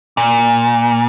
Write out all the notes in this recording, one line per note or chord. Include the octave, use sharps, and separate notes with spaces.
A#2